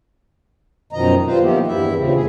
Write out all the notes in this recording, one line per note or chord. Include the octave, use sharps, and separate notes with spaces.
F#2 B2 D#3 F3 D#5 A#5
G3 C4 F4 B4 C5
D#3 F3 A#3 B3 E4 G4
E2 G2 E4 E5
D#2 A#2 C#3 C4
F2 G#2 G#4